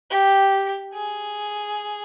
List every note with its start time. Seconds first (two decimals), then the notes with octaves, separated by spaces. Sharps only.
0.10 G4
0.94 G#4